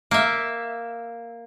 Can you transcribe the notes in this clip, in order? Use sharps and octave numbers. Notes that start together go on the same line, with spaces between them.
A#3 E5